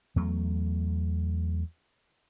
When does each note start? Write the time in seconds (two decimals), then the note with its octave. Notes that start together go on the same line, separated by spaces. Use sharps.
0.16 E2 F#3 A3